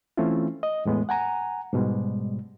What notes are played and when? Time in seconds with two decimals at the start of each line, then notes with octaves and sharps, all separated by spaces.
0.17 E3 A3 C4 C#4 E4 F4
0.63 D#5
0.85 E2 A2 G#3 B3
1.09 F#5 G#5 A#5
1.73 G#2 B2 G3 G#3